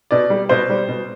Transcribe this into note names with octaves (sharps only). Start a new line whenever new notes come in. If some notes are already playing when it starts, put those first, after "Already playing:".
B2 D5
G3
B2 C5
G3
B2